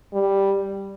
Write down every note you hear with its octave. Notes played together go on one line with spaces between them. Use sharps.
G3